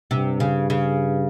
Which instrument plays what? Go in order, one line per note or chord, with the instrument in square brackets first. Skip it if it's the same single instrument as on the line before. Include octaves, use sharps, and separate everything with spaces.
[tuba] G2 [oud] C3
[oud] C#3
C#3